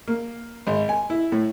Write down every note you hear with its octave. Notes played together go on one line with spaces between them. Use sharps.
A#3
G#1
G#5
E4
A2